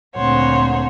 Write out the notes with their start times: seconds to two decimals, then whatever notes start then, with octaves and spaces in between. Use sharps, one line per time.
0.16 D2 A#2 C4 C5 C#5 F#5